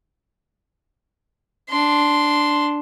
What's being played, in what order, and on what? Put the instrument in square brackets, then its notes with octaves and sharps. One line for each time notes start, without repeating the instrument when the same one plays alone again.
[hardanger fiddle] D4 C6